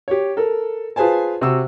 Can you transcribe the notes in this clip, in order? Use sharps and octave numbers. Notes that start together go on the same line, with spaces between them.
G4 C#5
A4 A#4
F4 G#4 B4 C5 G#5 A5
C3 F#4 E6